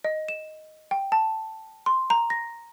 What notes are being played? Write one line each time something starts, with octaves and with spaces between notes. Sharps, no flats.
D#5
E7
G5
A5
C6
A#5
A#6